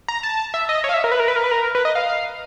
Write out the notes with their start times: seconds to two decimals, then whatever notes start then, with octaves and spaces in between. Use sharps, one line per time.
0.08 A#5
0.23 A5
0.54 E5
0.69 D#5
0.84 C#5
0.89 F5
0.94 E5
1.04 A#4
1.12 B4
1.20 A#4
1.28 B4
1.36 A#4
1.44 B4
1.51 A#4
1.75 B4
1.85 D#5
1.95 F5